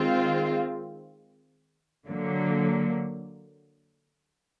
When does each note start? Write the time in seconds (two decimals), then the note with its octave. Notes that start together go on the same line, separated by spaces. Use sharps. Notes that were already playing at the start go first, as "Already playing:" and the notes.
Already playing: D#3 G#3 C4 F4
2.07 D3 F#3 A#3